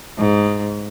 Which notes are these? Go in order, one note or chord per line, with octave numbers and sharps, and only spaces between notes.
G#2